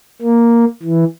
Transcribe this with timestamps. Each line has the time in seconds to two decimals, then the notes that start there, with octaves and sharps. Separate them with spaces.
0.22 A#3
0.83 E3